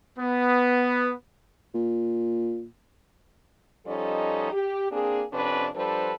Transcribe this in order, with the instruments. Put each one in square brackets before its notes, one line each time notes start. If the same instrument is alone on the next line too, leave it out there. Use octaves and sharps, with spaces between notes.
[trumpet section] B3
[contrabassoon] A#2
[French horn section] F3 G3 C#4 D#4 A4 D#5
G4
A#3 C4 D4 G#4
F2 C3 C#4 D4 B4 D5
F3 G3 D4 A4 B4 C5